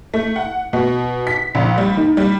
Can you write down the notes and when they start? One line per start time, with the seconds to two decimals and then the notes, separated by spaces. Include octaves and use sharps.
0.14 A3
0.36 F#5
0.73 B2
1.27 B6
1.55 A#1
1.78 G3
1.97 D#3
2.17 G3